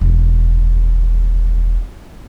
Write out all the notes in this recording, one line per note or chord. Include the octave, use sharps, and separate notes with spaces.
E1 D2